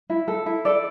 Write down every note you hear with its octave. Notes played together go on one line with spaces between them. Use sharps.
E4
A4
E4
A4 D5